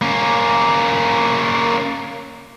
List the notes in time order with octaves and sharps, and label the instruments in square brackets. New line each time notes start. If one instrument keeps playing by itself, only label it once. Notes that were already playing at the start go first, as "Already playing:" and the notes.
[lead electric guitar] A#3 C#4